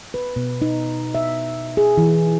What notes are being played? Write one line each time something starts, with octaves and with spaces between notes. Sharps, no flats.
B4
B2
D#4
E5
G#4
E3